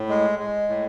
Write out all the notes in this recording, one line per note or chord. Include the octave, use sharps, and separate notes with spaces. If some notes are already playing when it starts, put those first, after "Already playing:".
Already playing: A2
G#3
G#3
A2